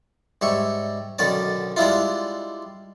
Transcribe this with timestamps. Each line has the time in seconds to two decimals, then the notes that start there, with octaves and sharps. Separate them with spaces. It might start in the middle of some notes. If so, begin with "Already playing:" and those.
0.41 G#2 G3 E5 C#6
1.19 B1 D3 D#3 C#4 D5 A5
1.76 G3 G#3 D4 E4 F4